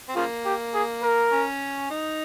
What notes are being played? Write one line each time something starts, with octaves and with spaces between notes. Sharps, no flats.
C4
C#3 F3 A#3 F4
G4
G#4
A#4
C#4
D#4